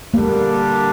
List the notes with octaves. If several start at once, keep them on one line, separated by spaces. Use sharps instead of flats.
D3 G3 A#3 D4